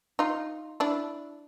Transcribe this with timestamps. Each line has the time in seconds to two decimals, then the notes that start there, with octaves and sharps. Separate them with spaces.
0.19 D#4 F4
0.80 D4 E4